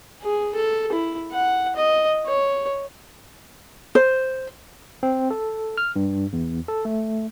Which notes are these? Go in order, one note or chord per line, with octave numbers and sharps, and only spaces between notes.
G#4
A4
E4
F#5
D#5
C#5
C5
C4
A4
F6
G2
E2
A4
A3